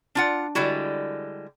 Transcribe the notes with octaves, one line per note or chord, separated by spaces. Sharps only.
D4 F4 F#5
D3 G3 G#3 E4 F#4